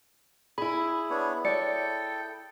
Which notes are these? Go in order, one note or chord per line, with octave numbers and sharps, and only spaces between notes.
E4 G#4 B5
B3 D4 C#5
A4 C#5 D5 G5 C#7